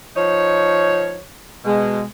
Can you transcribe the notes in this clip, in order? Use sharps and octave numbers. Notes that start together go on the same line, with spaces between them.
F3 D#4 C#5
B2 G#3